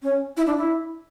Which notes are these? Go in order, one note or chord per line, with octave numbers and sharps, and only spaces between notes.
C#4
E4
D4
E4